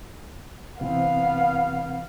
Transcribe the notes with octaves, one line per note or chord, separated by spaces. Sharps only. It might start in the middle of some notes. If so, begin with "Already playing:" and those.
C3 E3 B3 C4 F5